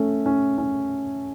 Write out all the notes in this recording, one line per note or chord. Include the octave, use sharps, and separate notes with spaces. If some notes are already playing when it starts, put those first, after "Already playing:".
Already playing: A3 C#4
C#4
C#4